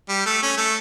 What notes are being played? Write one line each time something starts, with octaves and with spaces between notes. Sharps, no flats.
G3
A3
C#4
A3